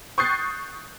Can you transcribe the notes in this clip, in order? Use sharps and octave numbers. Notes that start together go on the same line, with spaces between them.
C#6 D#6 F#6 G6 A6 C7